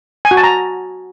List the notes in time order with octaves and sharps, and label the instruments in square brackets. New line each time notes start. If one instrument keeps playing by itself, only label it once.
[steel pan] G#5
F#4
A5
A#5